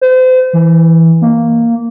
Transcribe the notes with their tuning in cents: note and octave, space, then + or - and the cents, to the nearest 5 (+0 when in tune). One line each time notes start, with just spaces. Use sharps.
C5 -35
E3 -5
A#3 -5